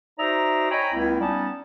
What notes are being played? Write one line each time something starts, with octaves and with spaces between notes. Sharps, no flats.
D#4 F#4 C5 D5 E5 A#5
C#5 D#5 G5 G#5 A#5 B5
C#2 A#3 C4 E4
G3 B3 C#4 D#4 A5